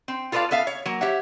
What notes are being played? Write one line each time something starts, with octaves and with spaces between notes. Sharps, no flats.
C4
F4 A4 B4 C5 D5 F5
B3 A4 E5 F5
C#5
F#3 A#3
G4 C#5 E5 F#5